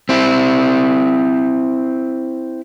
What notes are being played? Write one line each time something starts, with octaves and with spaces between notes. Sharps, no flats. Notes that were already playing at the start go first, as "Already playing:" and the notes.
C4 E4